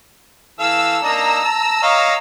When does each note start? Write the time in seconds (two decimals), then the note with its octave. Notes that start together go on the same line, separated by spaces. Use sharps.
0.59 E3 A4 F5 E6
1.03 A#3 D4 D#4 A#5 E6
1.44 A5
1.83 C#5 D#5 F5